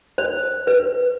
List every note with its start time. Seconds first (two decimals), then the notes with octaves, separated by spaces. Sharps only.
0.18 C5
0.67 B4